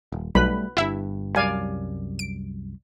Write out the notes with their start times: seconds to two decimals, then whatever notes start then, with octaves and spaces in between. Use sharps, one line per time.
0.12 D#1
0.35 B1 G3 A3 B4 B5
0.77 G1 G2 E4 E5
1.36 C2 F#2 G3 D5 F5 G#5
2.19 D7